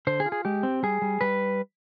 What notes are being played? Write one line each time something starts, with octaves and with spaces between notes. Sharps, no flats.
D3 C5
G#4
F4
G#4
G#3 G4
C4
G3 G#4
G3
G3 B4